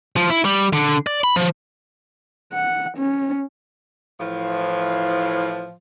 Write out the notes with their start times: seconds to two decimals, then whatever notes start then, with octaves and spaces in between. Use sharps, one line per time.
0.16 F3
0.30 E4
0.45 G3
0.73 D3
1.07 D5
1.24 B5
1.36 F3
2.53 F#5
2.97 C#4
4.20 A2 E3 F3